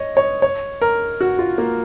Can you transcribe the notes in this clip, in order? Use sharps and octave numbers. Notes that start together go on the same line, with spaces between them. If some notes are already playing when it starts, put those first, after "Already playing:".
Already playing: C#5 D#5
C#5
C#5
A#4
F#4
F4
A#3